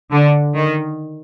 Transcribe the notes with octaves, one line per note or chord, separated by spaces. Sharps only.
D3
D#3